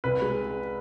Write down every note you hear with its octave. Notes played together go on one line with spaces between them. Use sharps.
C2 B4
G#3